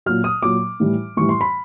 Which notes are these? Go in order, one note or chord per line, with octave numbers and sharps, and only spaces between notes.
A#2 F#3 F6
D#6
A#2 F#3 D6
A2 E3 G3
A2 E3 G3 C#6
C6
B5